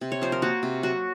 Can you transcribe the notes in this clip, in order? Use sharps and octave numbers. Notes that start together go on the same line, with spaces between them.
C3
C#5
F3 C5
A#4
A#3 F#4
C3
F#3 F#4